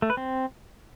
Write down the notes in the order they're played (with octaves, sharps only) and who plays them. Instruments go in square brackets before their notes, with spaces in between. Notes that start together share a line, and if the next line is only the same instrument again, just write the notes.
[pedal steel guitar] A3
B4
C4